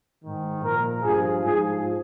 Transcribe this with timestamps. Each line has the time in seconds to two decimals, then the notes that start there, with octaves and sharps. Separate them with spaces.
0.23 G#2 D#3
0.63 A#2 F3 A#4
1.03 G2 F3 G#4
1.43 G#2 F3 G#4